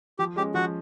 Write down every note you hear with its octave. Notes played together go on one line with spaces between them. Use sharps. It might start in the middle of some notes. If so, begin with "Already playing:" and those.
F3 G4
G#3 C#4 G4
F3 F#4